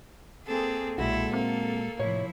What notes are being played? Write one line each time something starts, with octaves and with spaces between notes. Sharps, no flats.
A#3 C4 G#4 A4
B1 A#2 G#3 E4 F#4 A4
A#3 C4
C2 A2 F3 E4 C#5